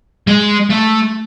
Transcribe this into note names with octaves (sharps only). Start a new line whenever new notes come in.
G#3
A3